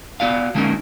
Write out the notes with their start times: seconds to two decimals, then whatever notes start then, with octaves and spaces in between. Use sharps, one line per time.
0.20 B3 F#4 D5 F5
0.55 D3 G#3 A#3 C#4 D#4 A#4